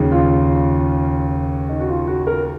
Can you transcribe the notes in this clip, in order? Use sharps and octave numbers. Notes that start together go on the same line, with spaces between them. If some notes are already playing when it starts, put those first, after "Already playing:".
Already playing: D#2 C#3 F#3
F4
D#4
F#4
F4
F#4
A#4